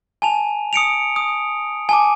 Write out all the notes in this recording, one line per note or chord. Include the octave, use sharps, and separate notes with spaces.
G#5 A5 F7
D#6 C#7 D7 F7
D#6
G#5 A5 D6